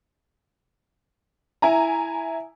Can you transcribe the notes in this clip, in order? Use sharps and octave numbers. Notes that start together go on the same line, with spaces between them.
E4 G#5 A#5